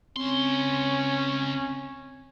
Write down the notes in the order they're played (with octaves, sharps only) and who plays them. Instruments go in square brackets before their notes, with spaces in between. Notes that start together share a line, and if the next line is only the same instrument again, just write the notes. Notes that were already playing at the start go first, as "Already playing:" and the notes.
[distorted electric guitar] C#2 C6 [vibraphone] C4 [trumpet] C#4